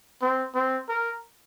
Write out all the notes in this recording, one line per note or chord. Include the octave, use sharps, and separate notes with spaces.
C4
C4
A#4